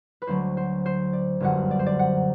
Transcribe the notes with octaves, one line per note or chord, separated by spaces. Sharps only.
B4
D2 D3 F#3 C5
C5
C5
D5
G1 F#2 D3 F#3 F#5
D5
C5
D5
F#5